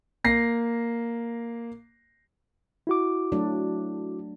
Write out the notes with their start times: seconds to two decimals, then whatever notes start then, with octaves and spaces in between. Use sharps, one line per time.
0.24 A#3 A#6 C7
2.87 E4 F#4 D6
3.32 F#3 A3 D4